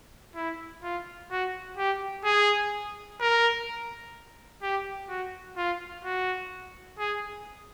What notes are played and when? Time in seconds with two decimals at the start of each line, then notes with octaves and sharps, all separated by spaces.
0.35 E4
0.82 F4
1.31 F#4
1.77 G4
2.25 G#4
3.20 A#4
4.62 G4
5.09 F#4
5.57 F4
6.05 F#4
6.99 G#4